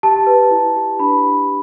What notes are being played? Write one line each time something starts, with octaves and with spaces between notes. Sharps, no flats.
G4 A5
B4
E4
G4
D4 B5
G4